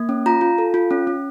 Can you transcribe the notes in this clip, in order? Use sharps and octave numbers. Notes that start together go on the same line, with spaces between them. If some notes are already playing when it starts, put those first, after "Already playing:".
Already playing: A#3
C#4
F4 A#5
F4
A4
F4
C#4
C#4